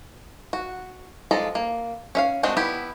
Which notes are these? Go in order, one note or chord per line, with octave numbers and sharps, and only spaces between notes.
F#4
F3 G#3 A4 D5 A#5
A#3
C#4 E5 F5
G#3 A3 C4 D4 F#4
B3 E4 G4